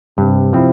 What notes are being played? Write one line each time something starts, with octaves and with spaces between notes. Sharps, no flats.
G2 C3
F3 C4 E4